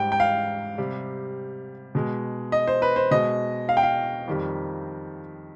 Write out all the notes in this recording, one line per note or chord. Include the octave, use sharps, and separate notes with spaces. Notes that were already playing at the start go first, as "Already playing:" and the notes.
Already playing: G#2 G3 G5
G5
F5
C3 G3
B2 G#3
D#5
C5
B4
C5
B2 G#3 D#5
F5
G5
F5
F2 D#3 G3